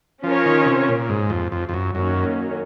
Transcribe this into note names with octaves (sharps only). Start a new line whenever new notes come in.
F3 C#4 F4 A#4 C#5
D#3
C3
A#2
G#2
F2
F2
F2
F#2
F#2 D#3 F#3 A#3 C#4